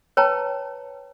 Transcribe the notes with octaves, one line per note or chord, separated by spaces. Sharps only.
B4 C#5 G5 A5 A#5